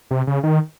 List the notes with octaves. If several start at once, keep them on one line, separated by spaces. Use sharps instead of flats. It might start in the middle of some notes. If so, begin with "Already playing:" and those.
C3
C#3
D#3